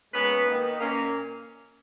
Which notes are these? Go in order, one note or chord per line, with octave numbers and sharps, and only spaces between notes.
A#2 G#3 B3 C#4 B4
D#3 A#3 D#4
A#2 A#3 C#4